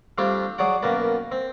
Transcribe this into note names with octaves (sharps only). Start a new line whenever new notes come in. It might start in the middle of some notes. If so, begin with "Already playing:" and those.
G3 A3 C4 D4 F4 G4
F#3 G#4 C#5 D5 F#5
F#2 B2 A#3 B4 A5
C4